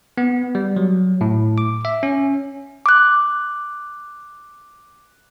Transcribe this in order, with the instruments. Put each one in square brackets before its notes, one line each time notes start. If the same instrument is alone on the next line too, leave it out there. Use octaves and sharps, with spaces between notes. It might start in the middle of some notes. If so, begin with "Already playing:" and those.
[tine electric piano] B3
G3
F#3
A2
D6
E5
C#4
[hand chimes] D6 F#6